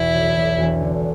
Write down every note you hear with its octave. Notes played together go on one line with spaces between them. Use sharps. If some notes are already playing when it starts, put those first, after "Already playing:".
Already playing: E2 B2 E4
B1
B1
E1
D3